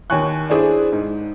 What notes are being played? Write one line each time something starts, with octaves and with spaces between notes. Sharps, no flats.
D#2 C#5 G#5 C#6 F#6
D4 E4 G#4 C5 D5
G#2